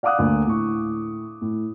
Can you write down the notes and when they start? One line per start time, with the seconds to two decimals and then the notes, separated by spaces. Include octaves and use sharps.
0.03 D5 F5 F#5 D6 D#6 F#6
0.19 D2 A#3
0.47 A2 C#6
1.41 A2